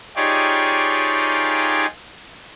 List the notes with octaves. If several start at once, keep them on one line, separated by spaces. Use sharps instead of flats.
D#4 F4 G4 G#4 C#5 D5